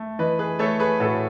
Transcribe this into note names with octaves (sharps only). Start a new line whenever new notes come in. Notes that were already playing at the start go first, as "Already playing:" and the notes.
Already playing: A3
E3 B4 D#5
G#4 B4
A3 A4 C#5
G#4 B4
A2 F#4 A4